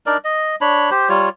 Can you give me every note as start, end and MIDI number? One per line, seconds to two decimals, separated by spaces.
0.06 0.17 62
0.06 0.17 63
0.06 0.17 70
0.06 0.17 74
0.24 0.56 75
0.61 0.90 62
0.61 0.90 73
0.61 0.90 83
0.91 1.09 67
0.91 1.09 72
1.09 1.29 55
1.09 1.29 65
1.09 1.29 73